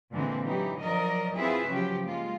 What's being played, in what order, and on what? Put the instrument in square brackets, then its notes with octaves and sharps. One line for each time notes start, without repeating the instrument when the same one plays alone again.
[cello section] A#2 D3 E3 G#3 A#3 C4
E3 F#3 D#4 E4 G4
F3 F#3 A#4 D5 D#5
C4 E4 F4 G#4 B4 E5
C#3 F3 F#3 G4
G#3 A#3 F4